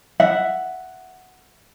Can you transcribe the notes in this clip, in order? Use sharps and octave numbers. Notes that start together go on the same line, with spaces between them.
E5 F#5